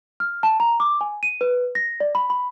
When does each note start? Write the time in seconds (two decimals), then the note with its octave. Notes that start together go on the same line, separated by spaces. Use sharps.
0.20 F6
0.43 A5
0.60 A#5
0.80 D6
1.01 G#5
1.23 D#7
1.41 B4
1.75 A#6
2.00 D5
2.15 B5
2.30 B5